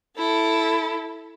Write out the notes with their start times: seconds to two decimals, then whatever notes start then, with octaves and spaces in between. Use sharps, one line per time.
0.18 E4 A4